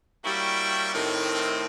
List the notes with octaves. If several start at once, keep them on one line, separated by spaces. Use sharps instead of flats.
G3 A#3 C#4 E4 F#4 G5
A2 D#3 C4